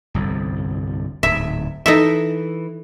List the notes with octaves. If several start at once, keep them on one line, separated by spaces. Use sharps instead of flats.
G1 C2 F2
D1 G#2 E5
E3 D#4 A4 E5